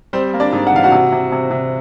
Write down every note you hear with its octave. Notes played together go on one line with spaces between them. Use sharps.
G3 C4 C5
A#3
D4 D5
G#2
F#5
E3 F5
F#4 F#5
C3
C3
C3
C3